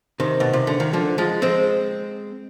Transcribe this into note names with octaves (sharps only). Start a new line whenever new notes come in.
C3 D#3
B2
C3
D3
D#3
D3 F3
F3 G#3
G#3 C4